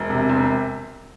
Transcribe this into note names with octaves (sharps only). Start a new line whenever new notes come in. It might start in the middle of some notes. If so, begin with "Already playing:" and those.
Already playing: E1
C3
E1